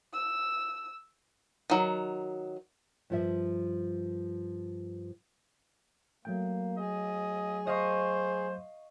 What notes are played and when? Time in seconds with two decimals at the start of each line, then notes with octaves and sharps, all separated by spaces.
0.13 E6
1.70 D#3 F#3
3.10 G2 F3 E5
6.25 F#3 A3 A#3 G5
6.78 G#4 D#5
7.67 C5 D#5 F5 C#6